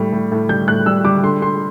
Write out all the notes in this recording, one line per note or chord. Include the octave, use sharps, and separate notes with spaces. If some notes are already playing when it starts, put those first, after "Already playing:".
Already playing: A2 G3
A2
A2
G3 G6
A2 F#6
G3 E6
G3 D6
D3 C6
D3 C6